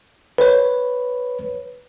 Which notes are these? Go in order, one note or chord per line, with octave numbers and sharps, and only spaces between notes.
B4 C#5